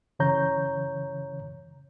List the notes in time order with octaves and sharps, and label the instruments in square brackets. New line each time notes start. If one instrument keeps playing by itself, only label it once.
[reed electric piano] F#2 C#3 E3 C#5 A#5 G6